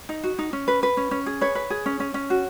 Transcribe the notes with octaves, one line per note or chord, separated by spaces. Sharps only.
D#4
F#4
D#4
C#4
B4
B4
C#4
C#4
G#4
B4 C#5
B4
G#4
C#4
C#4
C#4
F#4